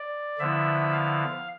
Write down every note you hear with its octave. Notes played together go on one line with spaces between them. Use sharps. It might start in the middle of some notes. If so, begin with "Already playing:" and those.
Already playing: D5
D3 F3 B3 E4 E5
F5